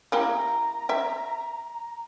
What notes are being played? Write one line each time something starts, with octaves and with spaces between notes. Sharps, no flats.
A#3 E4 G4 A#5
E5 G5